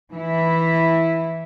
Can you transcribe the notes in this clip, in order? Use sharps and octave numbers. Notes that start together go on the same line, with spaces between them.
E3 E4